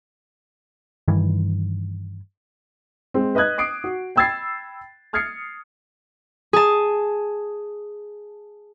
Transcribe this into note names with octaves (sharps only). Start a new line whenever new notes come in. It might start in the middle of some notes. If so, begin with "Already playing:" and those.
G2 D#3 E3
G#3 C4
B4 D#5 D#6 F#6 G#6
D6 D#6 C7 D7
F#4
G5 B5 E6 G#6 A6 C7
D#6 F6 G#6 A6 C7 C#7
G#4 A5